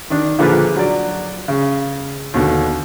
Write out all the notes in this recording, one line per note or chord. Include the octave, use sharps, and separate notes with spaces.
D#3 D4
A#2 D3 F3 G#4 B4 F6
F#3 D5
C#3
D#2 B2 D3